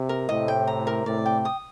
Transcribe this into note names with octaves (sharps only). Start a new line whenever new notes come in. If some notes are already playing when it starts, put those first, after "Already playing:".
Already playing: C3
A#4
A2 C3 D#5
G5
A#5
A#4
A2 C3 D5
G5
D#6